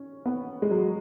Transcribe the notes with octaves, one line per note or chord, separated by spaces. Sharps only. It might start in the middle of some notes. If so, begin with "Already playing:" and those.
Already playing: C#4
B3
G#3
F#3